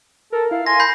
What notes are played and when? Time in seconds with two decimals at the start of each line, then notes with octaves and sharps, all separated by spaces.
0.32 A4 A#4
0.51 E4 F5
0.66 G#5 C6 A#6
0.80 B5 G6 C7